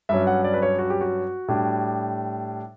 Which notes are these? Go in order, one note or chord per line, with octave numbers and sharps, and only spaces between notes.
G2 F#3 C#4 E5
F#5
D5
B4
C#5
F#4
G4
F#4
A2 G3 D4